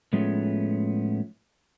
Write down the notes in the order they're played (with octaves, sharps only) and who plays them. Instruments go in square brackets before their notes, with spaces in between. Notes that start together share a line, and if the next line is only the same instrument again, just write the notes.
[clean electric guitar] A2 F3 G#3 A3 B3 C#4